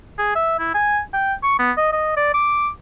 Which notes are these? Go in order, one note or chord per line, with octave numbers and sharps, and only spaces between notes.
G#4
E5
E4
G#5
G5
C#6
B3
D#5
D#5
D5
D6